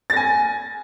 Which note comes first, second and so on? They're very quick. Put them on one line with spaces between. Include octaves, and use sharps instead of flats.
A6 A#6 G#5